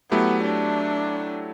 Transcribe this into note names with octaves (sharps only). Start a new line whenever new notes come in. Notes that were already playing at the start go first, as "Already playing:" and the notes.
F#3 A3 B3 E4 G4
D4